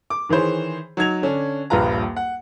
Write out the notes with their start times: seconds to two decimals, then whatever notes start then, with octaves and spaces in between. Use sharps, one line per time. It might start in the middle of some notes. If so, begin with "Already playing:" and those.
0.10 D6
0.29 D#3 E3 G#4 C5 C#5
0.97 F#3 D#4 G#6 F7
1.22 D3 C#4 D4
1.70 D#1 A#1 G2 F4 B4 A#5
2.17 F#5